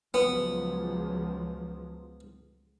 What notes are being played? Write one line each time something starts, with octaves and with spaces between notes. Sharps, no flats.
C#2 F3 F#3 B3